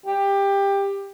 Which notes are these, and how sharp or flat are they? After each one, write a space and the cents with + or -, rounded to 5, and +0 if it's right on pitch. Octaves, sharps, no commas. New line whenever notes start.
G4 +15